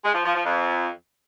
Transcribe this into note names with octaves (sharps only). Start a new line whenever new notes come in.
G#3
F3
F3
F3
F2